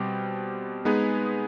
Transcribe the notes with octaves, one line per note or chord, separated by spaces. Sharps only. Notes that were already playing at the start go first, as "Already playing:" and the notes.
Already playing: B2 G3 C4 G4
G#3 B3 D#4 G#4 B4